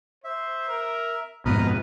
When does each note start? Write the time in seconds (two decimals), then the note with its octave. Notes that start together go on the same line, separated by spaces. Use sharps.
0.24 C5 E5
0.68 A#4
1.46 F2 G#2 B2 B4 A#5 D#6 F6